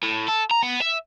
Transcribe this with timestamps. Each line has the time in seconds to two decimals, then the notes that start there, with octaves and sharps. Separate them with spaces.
0.03 A2
0.28 A4
0.51 A#5
0.63 B3
0.82 E5